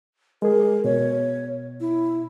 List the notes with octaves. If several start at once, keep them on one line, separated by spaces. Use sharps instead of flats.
G#3 G#4 A#4
B2 C#5
E4